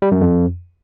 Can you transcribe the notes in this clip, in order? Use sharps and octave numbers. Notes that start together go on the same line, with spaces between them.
G3
F#2
F2